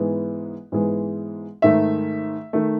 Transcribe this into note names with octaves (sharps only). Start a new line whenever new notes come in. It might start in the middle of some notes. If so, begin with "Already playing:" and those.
Already playing: G#2 E3 G#3 B3
G#2 E3 G#3 B3
G#2 D#3 A3 E5
D#3 A3